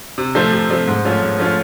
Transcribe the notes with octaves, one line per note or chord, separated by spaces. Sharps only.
C3
F3 A3 C4
C3
F3 A3 C4
G#2
F3 A3 C#4 F4
G#2
F3 A3 C#4 F4